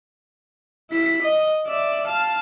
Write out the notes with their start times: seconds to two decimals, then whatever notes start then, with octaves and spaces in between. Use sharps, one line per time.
0.90 E4 B6
1.22 D#5
1.67 D5 E5
2.07 F5 A5